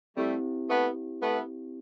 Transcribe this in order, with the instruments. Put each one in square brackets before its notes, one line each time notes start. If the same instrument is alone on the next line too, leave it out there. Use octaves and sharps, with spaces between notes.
[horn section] G3 A3 [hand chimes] C4 E4 G4
[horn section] A3 B3
A3 B3